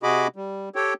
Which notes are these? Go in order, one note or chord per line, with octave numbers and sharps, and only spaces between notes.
C3 F#4 G#4 D#5 B5 D6
G3
G4 A4 C#5 G5